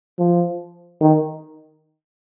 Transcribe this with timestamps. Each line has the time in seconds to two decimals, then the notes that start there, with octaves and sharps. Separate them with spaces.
0.19 F3
1.01 D#3